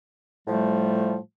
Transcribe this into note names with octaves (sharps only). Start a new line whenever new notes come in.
A2 F3 G3 A3